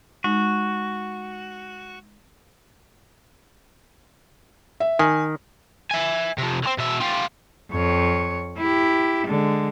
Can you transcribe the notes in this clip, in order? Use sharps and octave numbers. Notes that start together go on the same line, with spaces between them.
G#3 D#4 F#4
E5
D#3 G#5
E5 G#5
C3 F3
D3 C4
B2 E5
F4 G4
F2 C#5
E4 G4
D3 G#3